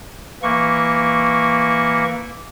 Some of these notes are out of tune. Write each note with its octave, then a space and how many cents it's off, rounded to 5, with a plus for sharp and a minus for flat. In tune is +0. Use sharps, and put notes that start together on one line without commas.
E3 +0 A#3 +0 C#6 -10